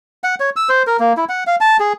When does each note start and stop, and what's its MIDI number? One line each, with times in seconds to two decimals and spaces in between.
0.24 0.35 78
0.40 0.50 73
0.56 0.69 88
0.69 0.83 72
0.87 0.97 70
1.00 1.13 58
1.17 1.25 64
1.29 1.44 78
1.47 1.56 77
1.61 1.77 81
1.80 1.93 68